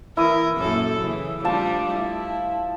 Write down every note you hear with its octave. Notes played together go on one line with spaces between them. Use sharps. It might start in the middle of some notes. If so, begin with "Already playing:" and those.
E3 E4 A#4 D#6
F#2 A#2 A4
C#3 E3
F3 G3 A3 D4 A5
E4